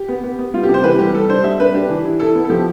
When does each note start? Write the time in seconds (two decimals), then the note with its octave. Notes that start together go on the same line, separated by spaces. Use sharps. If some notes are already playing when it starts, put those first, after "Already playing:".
Already playing: G4
0.08 B3
0.24 B3
0.39 B3
0.54 G3 F4
0.63 G4
0.69 C3
0.74 C5
0.84 E3 B4
0.99 G3 G4
1.14 G3 A4
1.30 D4 C5
1.44 G3 E5
1.60 D4 B4
1.75 D4 G4
1.90 E3
2.05 E4
2.20 E4 A4
2.35 B3
2.45 A4
2.50 F3 G4